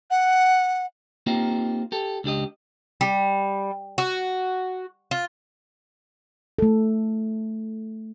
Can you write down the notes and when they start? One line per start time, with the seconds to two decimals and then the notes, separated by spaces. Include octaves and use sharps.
0.11 F#5
1.26 A#3 C4 D#4 F4 G4
1.92 G4 A4
2.24 C#2 D4 G4 D#5
3.01 G3
3.98 F#4
5.11 F4
6.59 A3 A4